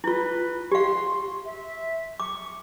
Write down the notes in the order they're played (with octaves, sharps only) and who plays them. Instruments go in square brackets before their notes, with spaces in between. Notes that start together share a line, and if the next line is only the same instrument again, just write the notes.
[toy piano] E4 F4 [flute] B4
[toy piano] G4 F5 [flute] C6
[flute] E5
[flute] C#6 [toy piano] D6